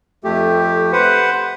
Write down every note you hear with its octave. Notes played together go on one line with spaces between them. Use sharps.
F2 A3 G4
B4 C5 F#5